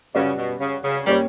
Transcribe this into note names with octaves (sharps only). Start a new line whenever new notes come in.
C#3 G3 C#4 F#4 B4 D5
B2
C#3
C#3
G3 A#3 C#4 G4 C#5